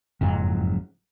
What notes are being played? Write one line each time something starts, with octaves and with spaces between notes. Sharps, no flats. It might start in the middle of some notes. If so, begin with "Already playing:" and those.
F#1 F2 G#2 F#3